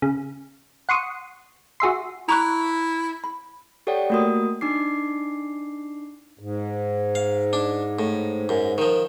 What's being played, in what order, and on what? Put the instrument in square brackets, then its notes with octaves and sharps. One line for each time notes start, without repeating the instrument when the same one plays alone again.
[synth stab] C#3
F#5 C6 C#6 D#6
F#4 G#4 E5 C6
[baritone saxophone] E4 [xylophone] A#5 C#6 F#6
[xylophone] B5
[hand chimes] G4 A4 C#5 D5 F#5 G5
A3 A#3 F#4 A#4 D#6
D4 D#4 D6 C7
[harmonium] G#2
[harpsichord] F5
D4
A2
F#2
D#3 F3